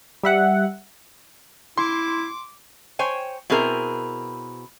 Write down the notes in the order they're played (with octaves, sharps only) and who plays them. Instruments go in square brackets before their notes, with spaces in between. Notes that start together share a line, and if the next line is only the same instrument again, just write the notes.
[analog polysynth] G3 E5 F#5
[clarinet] E4 [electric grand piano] C6 [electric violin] D6
[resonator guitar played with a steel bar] C5 C#5 G5 G#5
B2 C4 E4 G#4 A#4